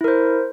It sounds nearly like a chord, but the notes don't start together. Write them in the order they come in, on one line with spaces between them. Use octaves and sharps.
E4 A#4 C5